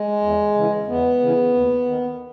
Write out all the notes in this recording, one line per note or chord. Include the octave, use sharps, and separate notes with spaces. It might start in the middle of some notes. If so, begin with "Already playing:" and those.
Already playing: G#3
E2
C#3 E3
E2 B3
C#3 E3
D#2
D#3